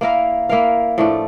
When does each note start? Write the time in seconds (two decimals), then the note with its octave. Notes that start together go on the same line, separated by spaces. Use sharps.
0.01 A#3 E4 A#4 F5
0.49 A#3 E4 A#4 F5
0.98 A2 F3 A3 D4